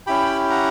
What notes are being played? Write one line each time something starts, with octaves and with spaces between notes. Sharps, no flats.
C#4 E4 G4 G5 B5
F#5 A#5